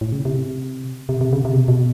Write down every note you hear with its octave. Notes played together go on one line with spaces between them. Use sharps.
A2
C#3
C3
C3
C3
C#3
C3
B2
B2